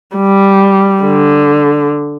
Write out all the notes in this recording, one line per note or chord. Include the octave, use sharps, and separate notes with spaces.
G3
D3